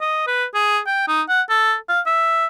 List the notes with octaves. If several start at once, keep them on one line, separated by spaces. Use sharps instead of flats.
D#5
B4
G#4
G5
D#4
F#5
A4
F5
E5